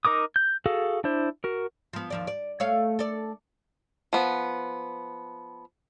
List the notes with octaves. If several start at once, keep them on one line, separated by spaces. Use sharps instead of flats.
D#4 A#4 D6 D#6
G6
F#4 G#4 A4 F5
D4 E4 C5
F#4 A#4
F3 B3
D#2 F3 D5
D5
A3 C#5 F5
A4 D5
F3 B3